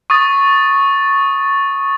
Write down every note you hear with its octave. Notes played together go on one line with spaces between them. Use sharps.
C#6 D#6 A6